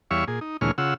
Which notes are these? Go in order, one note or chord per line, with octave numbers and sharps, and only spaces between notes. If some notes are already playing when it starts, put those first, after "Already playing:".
E2 G3 C#5 E5 F5 C#6
A#2 G#4
D#4
D2 A#2 E3 G#3 C#5 F6
C#3 F4 F#5 E6